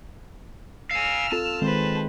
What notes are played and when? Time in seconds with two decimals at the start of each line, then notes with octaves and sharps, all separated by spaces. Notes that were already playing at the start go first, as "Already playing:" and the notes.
0.91 F5 G#5 E6 F6
1.32 C4 F4 A4 A5
1.62 D#3 G#3 C4 B4 C5